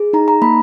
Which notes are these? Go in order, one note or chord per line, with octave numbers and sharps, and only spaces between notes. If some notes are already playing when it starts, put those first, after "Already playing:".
Already playing: G#4
D#4 A#5
A#5
A#3 B5